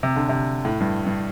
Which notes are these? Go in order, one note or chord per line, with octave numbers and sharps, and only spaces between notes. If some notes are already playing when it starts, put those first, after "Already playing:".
C3
D3
C3
A2
G2
G2